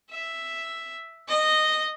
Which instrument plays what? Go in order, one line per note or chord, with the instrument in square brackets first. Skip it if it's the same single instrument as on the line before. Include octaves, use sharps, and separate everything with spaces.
[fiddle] E5
D#5